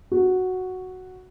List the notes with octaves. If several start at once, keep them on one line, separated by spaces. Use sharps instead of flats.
F#4